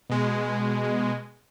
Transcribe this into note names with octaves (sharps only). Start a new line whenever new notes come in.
B2 G#3